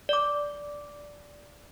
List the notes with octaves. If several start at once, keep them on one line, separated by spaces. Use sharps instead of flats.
D5 D6